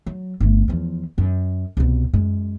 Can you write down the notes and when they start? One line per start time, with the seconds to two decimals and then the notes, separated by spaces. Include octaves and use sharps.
0.06 F#3
0.40 G1 A3
0.68 E2 F3
1.18 F#2
1.77 C2 B2
2.14 F#2 G#3